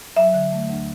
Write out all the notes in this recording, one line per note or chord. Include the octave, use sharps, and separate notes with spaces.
F#3 E5
D3
A3
D2